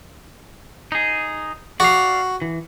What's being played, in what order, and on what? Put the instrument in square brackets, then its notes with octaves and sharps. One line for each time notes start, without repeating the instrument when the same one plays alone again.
[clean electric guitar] D#4 G#4
[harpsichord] F#4 [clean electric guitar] D5 F5
[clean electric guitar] E3